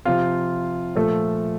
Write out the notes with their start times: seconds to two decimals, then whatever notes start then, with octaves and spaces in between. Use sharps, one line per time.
0.05 C3 F3 F4 F5
0.96 A#2 F3 A3 A4